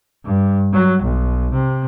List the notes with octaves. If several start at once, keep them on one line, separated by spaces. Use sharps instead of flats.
G2
F#3
B1
C3